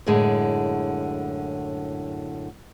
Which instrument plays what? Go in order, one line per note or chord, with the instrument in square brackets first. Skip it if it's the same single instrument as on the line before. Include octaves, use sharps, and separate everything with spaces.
[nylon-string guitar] F#2 A2 D3 G#3